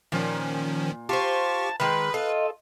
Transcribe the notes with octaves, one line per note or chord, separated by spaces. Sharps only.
A#2 D#3 F3 C#4
F4 G4 C5 A5 C#6
D#3 G#3 B4 B5
F4 A4 D#5